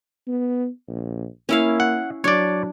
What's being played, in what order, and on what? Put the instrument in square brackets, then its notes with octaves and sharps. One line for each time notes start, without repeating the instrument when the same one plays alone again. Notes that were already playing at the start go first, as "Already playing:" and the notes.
[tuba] B3
A#1
[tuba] A#3 [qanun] C#4 E4 F5
[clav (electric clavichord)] F#5
[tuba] F#3 [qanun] D4 [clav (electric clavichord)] C#5 D5